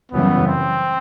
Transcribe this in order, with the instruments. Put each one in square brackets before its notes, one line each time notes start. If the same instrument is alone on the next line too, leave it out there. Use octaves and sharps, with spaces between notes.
[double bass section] F#2 C#3 E3 G3 [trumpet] B3
[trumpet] C4